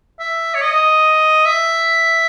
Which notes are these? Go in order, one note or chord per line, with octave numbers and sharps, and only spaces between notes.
E5
C#5
D#5
E5